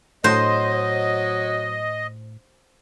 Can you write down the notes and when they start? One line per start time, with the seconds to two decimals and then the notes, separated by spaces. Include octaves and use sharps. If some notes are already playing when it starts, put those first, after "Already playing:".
0.24 A2 F#3 C5 D#5